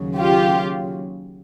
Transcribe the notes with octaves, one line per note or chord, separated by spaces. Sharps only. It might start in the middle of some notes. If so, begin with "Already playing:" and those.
Already playing: D#2 C#3 F#3
F4 G4